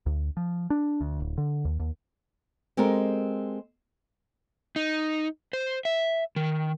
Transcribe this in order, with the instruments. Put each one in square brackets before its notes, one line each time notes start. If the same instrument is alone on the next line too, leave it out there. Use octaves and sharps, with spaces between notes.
[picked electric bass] D2
F3
D4
D2
D1
D3
D#2
D#2
[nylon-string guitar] G#3 C4 G4 A4 A#4
[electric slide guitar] D#4
C5
E5
D#3